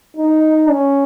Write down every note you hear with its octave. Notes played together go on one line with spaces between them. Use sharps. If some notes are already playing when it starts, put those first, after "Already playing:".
D#4
C#4